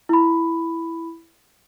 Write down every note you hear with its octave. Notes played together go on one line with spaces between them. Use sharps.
E4 B5